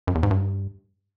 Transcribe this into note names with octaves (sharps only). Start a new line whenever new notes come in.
F#2
E2
G#2
G2